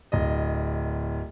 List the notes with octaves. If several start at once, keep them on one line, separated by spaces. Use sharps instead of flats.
D1 D#5